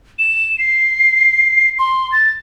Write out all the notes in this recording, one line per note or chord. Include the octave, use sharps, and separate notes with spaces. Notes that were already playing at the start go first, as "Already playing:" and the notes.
E7
C7
C6
A6